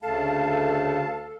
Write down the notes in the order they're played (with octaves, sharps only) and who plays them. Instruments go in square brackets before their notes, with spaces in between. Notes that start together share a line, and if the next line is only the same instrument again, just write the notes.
[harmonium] D2 C#3 A3 [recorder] A4 [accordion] F5 A5